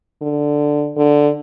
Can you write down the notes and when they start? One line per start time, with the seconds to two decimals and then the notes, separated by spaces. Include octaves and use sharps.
0.21 D3
0.97 D3